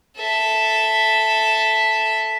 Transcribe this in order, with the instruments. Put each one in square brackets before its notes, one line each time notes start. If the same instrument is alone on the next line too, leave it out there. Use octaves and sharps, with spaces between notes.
[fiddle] A4 E5